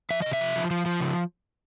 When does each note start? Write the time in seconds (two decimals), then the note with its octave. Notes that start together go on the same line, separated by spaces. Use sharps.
0.10 F3 E5
0.22 C3 D#5
0.33 E5
0.40 F3
0.56 F3
0.71 F3
0.86 F3
1.00 C#3